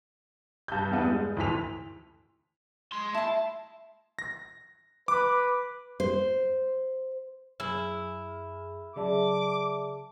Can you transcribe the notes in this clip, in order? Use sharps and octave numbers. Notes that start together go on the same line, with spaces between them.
G2 G6
E2 G2 B3 E4
G3 G#3
D2 A2 E3 A5 B6 F7
G#3 C6
E4 A5 C6
A#6
B4 D6
C5
F#2 E4 G#4 F6
C#3 F#3 G#4 D5 E5 A5 D6